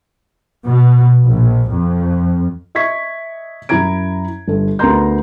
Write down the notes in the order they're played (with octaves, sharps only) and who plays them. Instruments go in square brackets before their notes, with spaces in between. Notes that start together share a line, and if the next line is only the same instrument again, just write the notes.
[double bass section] B2
A#1
F2
[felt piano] D#5 E5 C#6 G#6 B6
F#2 E4 A#5 G#6 D7
G1 A4
D2 B3 A#4 A#5 C6 G6